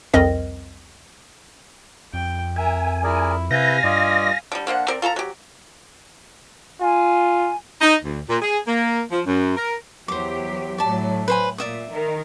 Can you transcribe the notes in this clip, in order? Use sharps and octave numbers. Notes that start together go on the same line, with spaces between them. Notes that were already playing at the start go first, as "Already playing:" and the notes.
C2 F2 C4 A#4 D#5 A#6
F2 G5
A#4 E5 G#5
E4 G#4 A#4 D5
C3 E4 B4 F5 G#5 G6 A#6
G2 F4 D5 D#5
D3 G3
D3 A#3 C5 F#5
C4 A#4 D5
F4 A4 A5 A#5
F#3 G4
F4 G#5
D#4
D2
A#2
G#4
A#3
F3
F#2
A#4
E2 F#3 G4 C5 D6
A2 F#3 D5 A5
B4 C5 G#5
A#2 D5 E5 D#6
D#3 A#4